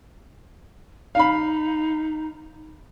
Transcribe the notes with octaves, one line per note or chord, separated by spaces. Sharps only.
D#4 F5 B5